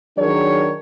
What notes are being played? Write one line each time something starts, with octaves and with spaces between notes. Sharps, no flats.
D#3 F#3 D4 G#4 A#4 C#5